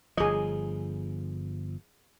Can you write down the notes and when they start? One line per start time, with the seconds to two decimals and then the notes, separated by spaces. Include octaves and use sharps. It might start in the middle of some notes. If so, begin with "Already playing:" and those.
0.17 G1 F3 G#4 D#5